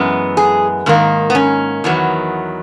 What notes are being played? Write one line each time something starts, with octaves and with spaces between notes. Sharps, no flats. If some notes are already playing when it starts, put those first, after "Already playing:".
Already playing: F#2 E3 G#3 B3
G#4
G#2 D#3 A#3
B3
C#4
E2 D#3 F#3 B3